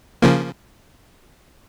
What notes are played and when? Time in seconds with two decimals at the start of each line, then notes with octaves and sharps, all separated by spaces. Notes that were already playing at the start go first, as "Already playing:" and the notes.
0.22 C#3 F3 A#3